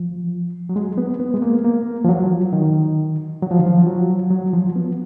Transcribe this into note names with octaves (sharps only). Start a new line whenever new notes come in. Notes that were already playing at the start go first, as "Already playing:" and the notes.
Already playing: F3
F#3
G#3
B3
B3
G#3
A#3
A#3
F3
F#3
D#3
F#3
F3
D#3
F3
F#3
F#3
F3
B3